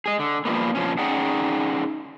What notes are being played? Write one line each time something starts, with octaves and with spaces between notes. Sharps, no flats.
G#4 D#5
D3
A#2 F3 G3 A#3 B3
A#2 F3 C#4
C#4 D#4 G#4 D5 F#5 G5